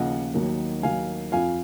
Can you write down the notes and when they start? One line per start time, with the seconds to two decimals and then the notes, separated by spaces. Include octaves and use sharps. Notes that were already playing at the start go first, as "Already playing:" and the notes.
Already playing: D#2 C#3 F3 D#5 F#5
0.34 D#2 D#3 F#3
0.82 D#2 D#3 F#3 F5 G#5
1.32 F2 F3 F5 G#5